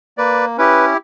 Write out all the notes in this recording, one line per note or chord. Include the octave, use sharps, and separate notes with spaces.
A#3 B4 D5
C#4 E4 G4 B4